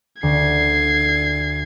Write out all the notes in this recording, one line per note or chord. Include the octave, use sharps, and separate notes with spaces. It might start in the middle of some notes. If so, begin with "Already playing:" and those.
D2 G#6 C7